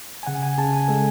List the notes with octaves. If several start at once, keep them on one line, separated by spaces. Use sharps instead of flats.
G#5
C#3 F#5
G#5
C#3 A5
G#5
G#3 A4